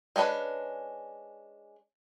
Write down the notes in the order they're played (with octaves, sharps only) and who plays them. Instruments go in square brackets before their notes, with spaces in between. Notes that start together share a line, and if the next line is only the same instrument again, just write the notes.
[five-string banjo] G#3 C#4 D4 B4